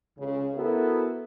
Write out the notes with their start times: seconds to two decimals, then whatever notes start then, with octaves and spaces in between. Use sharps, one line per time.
0.19 C#2 C#3
0.55 B3 E4 F#4 A4 A#4